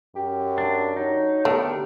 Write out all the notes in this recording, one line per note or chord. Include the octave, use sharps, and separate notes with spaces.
F#2 G4
D4
F#3 D#4
D3 A3 B3 G4 A#4